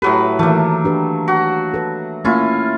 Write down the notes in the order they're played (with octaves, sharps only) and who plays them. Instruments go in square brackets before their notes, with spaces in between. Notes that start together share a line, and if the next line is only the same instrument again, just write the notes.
[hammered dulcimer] A2 F#3 B4 [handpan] G4 A4
[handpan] D#3 E3 [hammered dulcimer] A3 A#3
[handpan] D4 G4 B4
[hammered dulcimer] F#4
[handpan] A4 B4
[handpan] A3 A#3 [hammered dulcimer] C#4 E4 F4